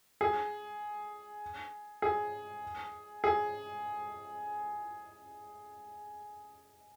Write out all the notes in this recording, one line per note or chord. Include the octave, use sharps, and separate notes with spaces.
G#4
G#4
G#4